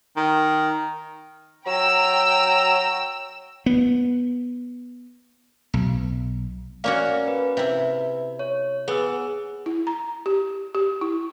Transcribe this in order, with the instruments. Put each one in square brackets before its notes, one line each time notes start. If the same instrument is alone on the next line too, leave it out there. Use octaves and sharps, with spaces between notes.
[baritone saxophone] D#3
[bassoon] F#3 [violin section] G5 E6 [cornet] A#5
[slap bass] B3
B1
[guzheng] A#3 C#4 F#4 [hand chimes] D5 F5
[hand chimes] B4
[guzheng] C3 E4
[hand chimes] C#5
[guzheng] B3 [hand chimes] G#4 E6
[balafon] E4
A#5
G4
G4
E4